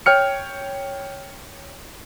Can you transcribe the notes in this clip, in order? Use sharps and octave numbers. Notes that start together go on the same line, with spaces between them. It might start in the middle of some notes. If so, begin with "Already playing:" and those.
C#5 G5 F6 C#7